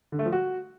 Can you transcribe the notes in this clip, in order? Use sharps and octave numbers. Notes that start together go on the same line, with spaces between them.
D3
A3
F3
F#4